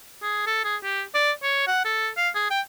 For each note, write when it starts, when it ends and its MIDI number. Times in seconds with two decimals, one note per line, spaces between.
0.22 0.45 68
0.46 0.62 69
0.64 0.76 68
0.83 1.02 67
1.14 1.32 74
1.43 1.64 73
1.67 1.83 78
1.85 2.09 69
2.17 2.29 77
2.35 2.48 68
2.50 2.61 79